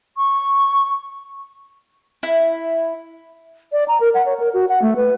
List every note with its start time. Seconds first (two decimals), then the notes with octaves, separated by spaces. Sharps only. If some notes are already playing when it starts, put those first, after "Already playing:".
0.17 C#6
2.23 E4
3.72 D5
3.88 A#5
4.00 A#4
4.14 F#5
4.26 C#5
4.40 A#4
4.54 F#4
4.69 F#5
4.82 A3
4.96 B4